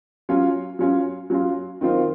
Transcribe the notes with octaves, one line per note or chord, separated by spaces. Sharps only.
F#3 C#4 F4
F#3 C#4 F4
F#3 C#4 F4
D#3 F#3 C4 F4